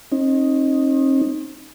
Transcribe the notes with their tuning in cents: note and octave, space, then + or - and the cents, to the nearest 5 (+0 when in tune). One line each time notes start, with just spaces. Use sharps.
C4 +45 D#4 +0